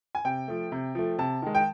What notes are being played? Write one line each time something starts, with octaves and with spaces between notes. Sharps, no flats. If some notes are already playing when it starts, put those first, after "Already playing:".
G#5
C3 G5
F3 A3
C3
F3 A3
C3 A5
D#3 G#3
G5